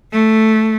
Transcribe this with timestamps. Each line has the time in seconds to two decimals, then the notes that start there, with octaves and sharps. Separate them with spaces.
0.12 A3